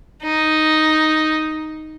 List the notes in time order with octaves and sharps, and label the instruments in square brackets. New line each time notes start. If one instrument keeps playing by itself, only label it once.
[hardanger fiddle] D#4